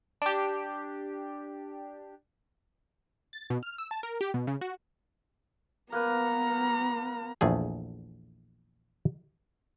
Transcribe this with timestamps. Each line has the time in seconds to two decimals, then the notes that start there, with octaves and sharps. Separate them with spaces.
0.22 D4 G4
3.33 A6
3.50 B2
3.63 F6
3.78 E6
3.91 A5
4.03 A#4
4.21 G4
4.34 B2
4.47 C#3
4.61 F#4
5.92 A#3 B3 B4 A#5
7.41 A#1 E2 A3 G#4